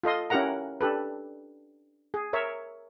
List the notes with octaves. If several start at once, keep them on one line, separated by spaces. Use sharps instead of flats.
F4 A4 D#5 C6
C#4 E4 G4 A#4 F#5 A#5
D4 G4 A4 B4
G#4
A#4 C#5 E5